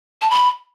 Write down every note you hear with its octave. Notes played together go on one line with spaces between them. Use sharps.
A5
B5